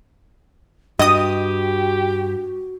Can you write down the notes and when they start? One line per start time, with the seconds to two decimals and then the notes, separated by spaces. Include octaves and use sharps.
0.99 G2 F#4 G4 D#5 D#6